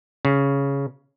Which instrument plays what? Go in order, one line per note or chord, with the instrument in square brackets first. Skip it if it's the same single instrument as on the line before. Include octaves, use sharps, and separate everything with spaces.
[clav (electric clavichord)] C#3